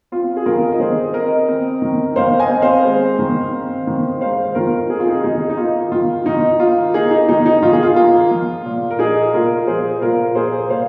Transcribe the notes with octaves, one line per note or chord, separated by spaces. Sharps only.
C4 F4
G#4
D#3 F4 A#4
D#5
D#3 G#4 C5
C4 A#4 D#5
C4
D#3
D#3 C5 F5
D#5 G#5
C4
C5 F5
G#3
D#3
C4
D#3
G#3 C5 F5
D#3 F4 A#4
C4 G#4
F4
D#4 G#4
D#3 D#4 G#4
D#4
A#3 F4
D#3 F4
D#3 D#4
A#3 F4
A#3 D#4 G#4
D#4
D#3 D#4
D#4
D#3 F4
G#4
F4
A#3 F4
F3
A#2
A#4
A#3 D#4 G#4
A#2 F4 A#4
F3 G#4 C5
A#2 F4 A#4
A#3 G#4 C5
A#2 C5 F5